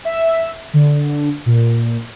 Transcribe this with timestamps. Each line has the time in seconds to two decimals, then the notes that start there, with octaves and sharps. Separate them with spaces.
0.05 E5
0.73 D3
1.46 A#2